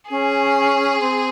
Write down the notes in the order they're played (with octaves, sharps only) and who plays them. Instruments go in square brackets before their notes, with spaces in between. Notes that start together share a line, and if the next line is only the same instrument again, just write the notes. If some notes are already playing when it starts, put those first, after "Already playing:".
[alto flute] C#4 [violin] G#4
[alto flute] C4